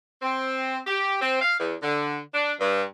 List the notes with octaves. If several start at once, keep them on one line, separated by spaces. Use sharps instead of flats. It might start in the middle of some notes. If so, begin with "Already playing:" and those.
C4
G4
C4
F5
E2
D3
D4
G2